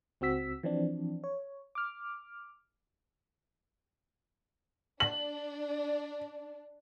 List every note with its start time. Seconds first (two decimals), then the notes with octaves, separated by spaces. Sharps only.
0.21 C#2 C4 F#4 E6 B6
0.63 E3 F3 C4 D4
1.24 C#5
1.75 D6 F6
5.00 D4 F#7